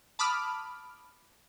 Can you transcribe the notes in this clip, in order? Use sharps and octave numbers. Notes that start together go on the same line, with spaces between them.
A5 B5 D6 D#6 F6 D7